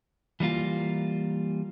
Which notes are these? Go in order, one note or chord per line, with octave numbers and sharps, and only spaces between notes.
E3 G3 A#3 F4